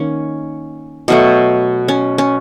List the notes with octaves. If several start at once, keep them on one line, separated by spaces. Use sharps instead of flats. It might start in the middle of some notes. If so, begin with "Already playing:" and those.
Already playing: D#3 A#3 C#4
B2 F#3 A3
C#4
C#4